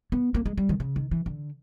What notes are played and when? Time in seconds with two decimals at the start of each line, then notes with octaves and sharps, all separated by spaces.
0.12 B3
0.35 A#3
0.46 G#3
0.58 G3
0.69 D#3
0.80 C#3
0.96 D#3
1.11 E3
1.26 D3